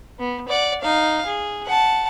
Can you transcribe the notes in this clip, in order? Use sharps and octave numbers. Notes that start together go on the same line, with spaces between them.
B3
D5 F#5
D#4 F5
G#4
F#5 A5